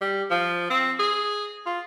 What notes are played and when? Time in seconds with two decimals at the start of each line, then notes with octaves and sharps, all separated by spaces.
0.01 G3
0.31 F3
0.70 C4
0.99 G#4
1.66 F4